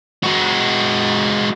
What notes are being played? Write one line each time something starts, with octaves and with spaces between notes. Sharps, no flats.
G#3 F#4